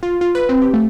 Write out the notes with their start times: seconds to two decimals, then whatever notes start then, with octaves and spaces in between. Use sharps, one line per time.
0.03 F4
0.21 F4
0.35 B4
0.49 C4
0.62 G4
0.74 A3